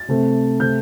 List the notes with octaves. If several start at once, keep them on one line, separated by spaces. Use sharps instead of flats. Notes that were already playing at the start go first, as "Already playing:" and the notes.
Already playing: A6
C3 A3 C4
C3 A3 C4 G6